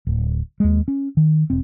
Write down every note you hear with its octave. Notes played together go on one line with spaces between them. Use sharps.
D1
D#2 G#3
C#4
D#3
E1 C4